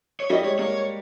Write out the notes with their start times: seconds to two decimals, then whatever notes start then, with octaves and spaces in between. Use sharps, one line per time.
0.20 C#5
0.30 G3 D#5
0.44 G#3 C#5
0.59 A#3 C#5